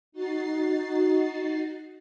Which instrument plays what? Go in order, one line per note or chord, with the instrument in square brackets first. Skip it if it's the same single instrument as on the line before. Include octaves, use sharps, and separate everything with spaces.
[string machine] D#4 F#4 A6 C7